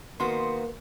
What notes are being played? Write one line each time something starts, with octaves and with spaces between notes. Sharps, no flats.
D#3 A#3 B3 F#4 B4 C6